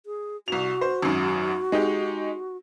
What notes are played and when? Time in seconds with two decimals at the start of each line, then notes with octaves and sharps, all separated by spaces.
0.06 G#4
0.48 C2 F#4 F7
0.81 C5
1.02 G#1 F#2
1.72 G#3 D#4 G4